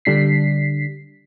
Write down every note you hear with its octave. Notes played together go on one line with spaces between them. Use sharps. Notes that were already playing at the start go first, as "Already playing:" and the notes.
D3 G3 D4 B6 C7